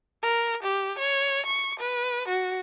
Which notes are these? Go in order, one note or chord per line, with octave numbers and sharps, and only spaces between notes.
A#4
G4
C#5
C#6
B4
F#4